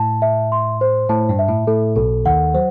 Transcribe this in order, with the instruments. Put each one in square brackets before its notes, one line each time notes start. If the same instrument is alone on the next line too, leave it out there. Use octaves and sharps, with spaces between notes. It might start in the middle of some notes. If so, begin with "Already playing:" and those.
Already playing: [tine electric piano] A2 [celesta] A5
[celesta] E5
C6
C5
[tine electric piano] A2 [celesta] A5
[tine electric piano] G2
[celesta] E5
[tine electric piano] A2
[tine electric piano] A2 [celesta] A4
[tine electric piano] B1 B2 [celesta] A4
[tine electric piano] D#2 D#3 [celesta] F#5
[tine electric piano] F#3 [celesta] C5